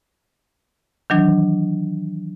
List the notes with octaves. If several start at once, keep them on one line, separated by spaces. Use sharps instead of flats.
D#3 E3 F#3 D4